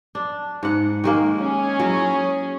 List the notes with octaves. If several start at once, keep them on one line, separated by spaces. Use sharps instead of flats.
D4
G#2 F#5
D#3 G#3 A#3
C#4 G#4
F#3 E4